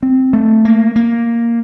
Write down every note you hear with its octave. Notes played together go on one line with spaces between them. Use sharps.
C4
A3
A#3
A#3